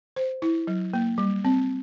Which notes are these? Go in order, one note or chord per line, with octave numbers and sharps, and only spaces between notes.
C5
E4
F#3
A#3
G3
C4